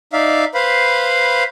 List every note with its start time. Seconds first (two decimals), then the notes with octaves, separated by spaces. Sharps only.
0.13 D#4 D5 E5 F5
0.54 B4 C5 F5 B5